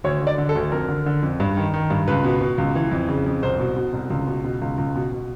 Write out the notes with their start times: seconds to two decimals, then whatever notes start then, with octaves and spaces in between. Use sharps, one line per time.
0.04 D2 C#5
0.21 D3
0.27 D5
0.38 D3
0.49 A4
0.55 D2
0.72 F2 A#4
0.89 D3
1.06 D3
1.23 F2
1.40 G2
1.57 D#3
1.74 D#3
1.90 G2
2.08 C#2 B4
2.25 B2
2.41 B2
2.58 C#2
2.75 E3
2.91 F2
3.08 C#3
3.26 F2
3.43 C2 C5
3.60 B2
3.76 B2
3.93 C2
4.10 C#2
4.27 B2
4.44 B2
4.62 C#2
4.78 C#2
4.95 B2
5.12 B2